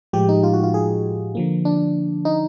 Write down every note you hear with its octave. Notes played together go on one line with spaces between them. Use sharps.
A2 F3 G#3 G4
D#4
F4
F#4
F4
G#4
D3 F3 A#3
D4
D#4